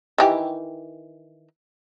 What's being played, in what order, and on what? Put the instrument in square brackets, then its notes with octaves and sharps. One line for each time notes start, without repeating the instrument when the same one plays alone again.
[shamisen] D#3 E3 G4